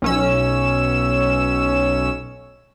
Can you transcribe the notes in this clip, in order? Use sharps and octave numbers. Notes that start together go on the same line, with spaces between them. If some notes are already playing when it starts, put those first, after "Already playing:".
B1 C#4 E6